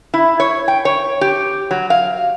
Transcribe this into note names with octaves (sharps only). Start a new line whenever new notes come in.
E4
C#5
G5
C#5
G4
F#3
F5